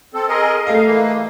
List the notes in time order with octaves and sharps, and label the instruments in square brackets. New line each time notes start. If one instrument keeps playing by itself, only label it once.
[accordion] C4 A4
G#4 A#4 D#5
[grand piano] A3 A4 D#5 [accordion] F5
[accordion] E3 A#3